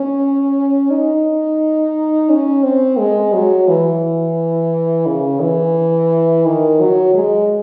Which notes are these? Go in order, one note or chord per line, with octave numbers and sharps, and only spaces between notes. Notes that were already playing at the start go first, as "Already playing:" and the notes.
Already playing: C#4
D#4
C#4
C4
G#3
F#3
E3
C#3
E3
D#3
F#3
G#3